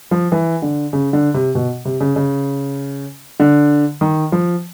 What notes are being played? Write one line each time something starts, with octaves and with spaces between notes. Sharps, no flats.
F3
E3
D3
C#3
D3
C3
B2
C3
C#3
C#3
D3
D#3
F3